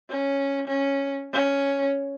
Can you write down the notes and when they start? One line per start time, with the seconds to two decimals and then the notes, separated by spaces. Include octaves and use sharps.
0.10 C#4
0.67 C#4
1.33 C#4